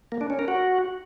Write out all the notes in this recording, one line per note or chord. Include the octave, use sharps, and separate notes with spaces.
A#3
D4
C#4
A#4
F#4